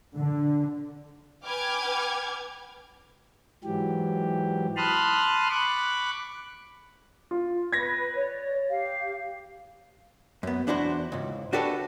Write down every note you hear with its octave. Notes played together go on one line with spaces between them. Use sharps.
D3
B4 G5 G#5 D6 F6 G#6
G#2 E3 F#3 G4
A5 B5 C6 D#6 F6 F#6
B5 C#6 D6 F#6
F4
B4 G#6 A#6
C#5 D5
G4 F5
F#2 B3
E2 D4 E4 F#4 C5
C#2 G#2
D4 F#4 G4 A4 B4 C#5